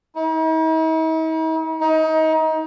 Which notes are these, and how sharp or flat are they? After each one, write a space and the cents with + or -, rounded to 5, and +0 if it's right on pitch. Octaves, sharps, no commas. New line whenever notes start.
D#4 +45
D#4 +25